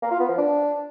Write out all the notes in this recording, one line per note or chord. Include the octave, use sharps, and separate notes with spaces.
A#3
F4
B3
F3
D4